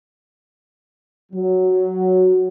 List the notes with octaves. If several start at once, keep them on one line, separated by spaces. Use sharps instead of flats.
F#3